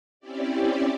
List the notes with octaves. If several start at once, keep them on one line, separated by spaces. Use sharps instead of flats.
C4 C#4 E4 G4 D5